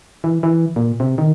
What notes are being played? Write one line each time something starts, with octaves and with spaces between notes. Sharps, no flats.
E3
E3
A#2
C3
D#3